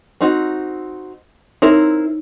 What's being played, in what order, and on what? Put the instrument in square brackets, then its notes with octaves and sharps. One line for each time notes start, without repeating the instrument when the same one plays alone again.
[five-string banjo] C4 D#4 F#4
[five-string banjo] C4 E4 A#4 [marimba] D#4 C#5